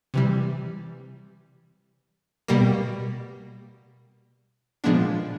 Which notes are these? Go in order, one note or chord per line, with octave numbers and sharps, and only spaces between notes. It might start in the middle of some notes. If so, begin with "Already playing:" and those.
C3 E3 G3
B2 G3 A#3
A#2 F3 G#3 B3 D4